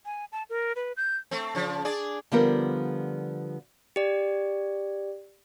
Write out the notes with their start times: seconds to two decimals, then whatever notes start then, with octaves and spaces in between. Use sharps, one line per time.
0.05 G#5
0.32 A5
0.50 A#4
0.76 B4
0.97 G6
1.31 A3 C4
1.55 C#3 F3
1.85 D4 G#4 D5
2.32 D3 F3 G3 B3 F4 A#4
3.96 G4 D5